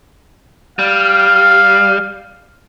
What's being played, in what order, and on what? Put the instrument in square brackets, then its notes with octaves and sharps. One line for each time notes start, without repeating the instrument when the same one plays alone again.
[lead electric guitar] G3 [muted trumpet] F5